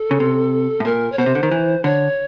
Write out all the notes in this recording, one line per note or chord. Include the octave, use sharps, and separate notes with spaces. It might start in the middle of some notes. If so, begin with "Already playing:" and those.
Already playing: A4
C#3
C3
A2
A#2 A#4
C#5
B2 C5
C3
D3
D#3
E3
D3 C#5